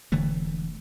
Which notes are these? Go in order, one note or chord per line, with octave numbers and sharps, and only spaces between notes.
E1 D3 E3 A3